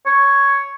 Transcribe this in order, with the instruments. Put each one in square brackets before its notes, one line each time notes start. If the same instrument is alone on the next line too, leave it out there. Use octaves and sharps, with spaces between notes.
[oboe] C#5